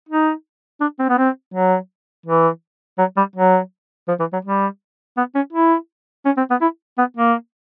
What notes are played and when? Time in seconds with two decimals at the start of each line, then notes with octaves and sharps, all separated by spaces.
0.09 D#4
0.81 D4
0.99 C4
1.09 B3
1.18 C4
1.54 F#3
2.26 E3
2.98 F#3
3.17 G3
3.36 F#3
4.08 F3
4.19 E3
4.33 F#3
4.45 G3
5.17 B3
5.35 C#4
5.53 E4
6.25 C#4
6.37 C4
6.50 B3
6.61 E4
6.98 B3
7.17 A#3